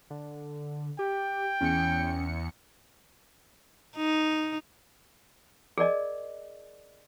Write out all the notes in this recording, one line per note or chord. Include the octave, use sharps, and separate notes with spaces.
D3
G4 G5
E2 C#4 C#7
D#4
G#4 A#4 D5 D#5